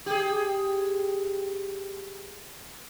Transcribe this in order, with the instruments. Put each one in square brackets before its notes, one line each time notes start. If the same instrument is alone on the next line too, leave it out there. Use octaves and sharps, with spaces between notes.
[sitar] G4 G#4